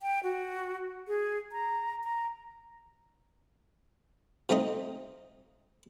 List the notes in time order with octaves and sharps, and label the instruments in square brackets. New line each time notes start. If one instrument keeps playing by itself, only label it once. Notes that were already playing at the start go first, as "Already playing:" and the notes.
[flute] G5
F#4
G#4
A#5
A#5
[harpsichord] F3 A3 C4 D#4 D#5